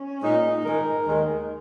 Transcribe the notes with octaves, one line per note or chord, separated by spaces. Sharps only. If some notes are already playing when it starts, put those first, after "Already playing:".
Already playing: C#4
A#2 G#3 D#4
G#2 D#3 G#3 A#4
D#2 D#3 G#3